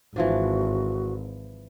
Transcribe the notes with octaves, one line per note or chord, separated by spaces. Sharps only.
G#1 E3 F3 D4 F#4